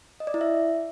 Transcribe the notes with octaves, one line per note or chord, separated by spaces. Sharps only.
D#5
D5
E4
E5